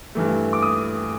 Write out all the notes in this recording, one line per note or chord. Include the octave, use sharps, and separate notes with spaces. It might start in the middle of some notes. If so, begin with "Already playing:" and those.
G2 E3 A3
D6
D#6